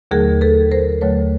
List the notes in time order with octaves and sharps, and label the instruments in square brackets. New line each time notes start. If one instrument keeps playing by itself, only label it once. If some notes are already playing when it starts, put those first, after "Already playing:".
[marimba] D#2 D3 F#3 A3 G#4 A#4
A4 B4
A#4 C5
D#2 D3 F#3 A3 B4 C#5